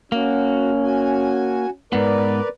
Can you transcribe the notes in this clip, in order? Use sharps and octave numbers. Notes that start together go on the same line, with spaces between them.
A#3 C#4 F#4
F#4 G#5
G#2 B3 A#4 B4 D5